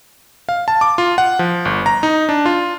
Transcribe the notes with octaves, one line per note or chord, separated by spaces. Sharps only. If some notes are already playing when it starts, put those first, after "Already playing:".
F5
A5
D6
F4
F#5
F3
G1
A#5
D#4
D4
F4